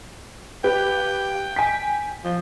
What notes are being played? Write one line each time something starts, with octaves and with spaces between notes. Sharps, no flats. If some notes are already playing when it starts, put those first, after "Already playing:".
G4 B4 G5
G#5 B6
F3